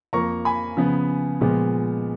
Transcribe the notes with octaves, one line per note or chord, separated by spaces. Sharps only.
F2 F3 A#3 A#5 C#6
G#5 B5
C#3 F3 B3
A#2 F3 G#3 B3